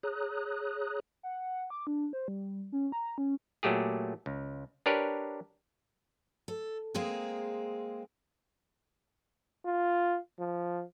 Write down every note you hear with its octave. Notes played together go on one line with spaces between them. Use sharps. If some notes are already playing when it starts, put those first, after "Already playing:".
G#4 C#5 A#5 D#6 F#6
F#5
D6
D4
C5
G3
C#4
A#5
C#4
A#2 F#3 A3 G4 G#4
C#2
D4 G4 A#4 B4 C#5 D5
A4
G#3 A#3 C4 G#4
F4
F3